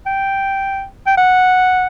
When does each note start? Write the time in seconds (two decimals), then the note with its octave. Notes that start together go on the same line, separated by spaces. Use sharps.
0.06 G5
1.07 G5
1.17 F#5